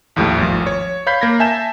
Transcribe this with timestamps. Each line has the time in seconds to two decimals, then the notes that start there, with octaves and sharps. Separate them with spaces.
0.16 A#1 D#2 A2 F3 G3 A3
0.38 G#1 F3
0.67 C#5
1.07 C#5 F5 B5 G6 B6 C7
1.21 A#3 G#6 A#6
1.40 E5 G#5 A5 G6 E7